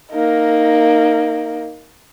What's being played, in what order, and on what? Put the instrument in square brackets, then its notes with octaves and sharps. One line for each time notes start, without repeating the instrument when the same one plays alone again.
[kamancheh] A#3 D#4